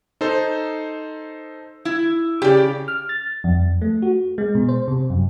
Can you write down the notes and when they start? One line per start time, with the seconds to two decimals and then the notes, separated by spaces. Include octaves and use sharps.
0.21 D#4 A4 C5
1.85 E4
2.42 C#3 G4 D5
2.88 F6
3.09 A6
3.44 F2
3.81 A3
4.02 F#4
4.38 G#3
4.55 B2
4.69 C5
4.88 C3
5.10 F#2